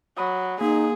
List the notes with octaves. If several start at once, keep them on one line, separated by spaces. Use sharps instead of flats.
F#3 B5 D#6
A#3 D#4 G#4